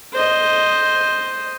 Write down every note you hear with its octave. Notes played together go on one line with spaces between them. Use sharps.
C5 D#5